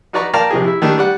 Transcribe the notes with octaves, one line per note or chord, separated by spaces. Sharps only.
D#4 F#4 B4 D5 A#5 C#6
A#4 D5 F5 G5 A5 A#5
A#1 C3 F3 G4 G#4
E4 E5
D#3 G3 A3 D4
G3 D5 F#5